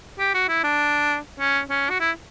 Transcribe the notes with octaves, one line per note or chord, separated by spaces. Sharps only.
G4
F#4
E4
D4
C#4
C#4
F#4
E4